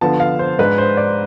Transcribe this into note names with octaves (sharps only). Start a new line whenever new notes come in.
D3 F3 B3 A5
F5
C5
G#2 G#3 D4 B4
C5
D5